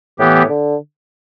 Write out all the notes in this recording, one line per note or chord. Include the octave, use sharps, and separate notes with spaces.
A2 E3 B3 G4
D3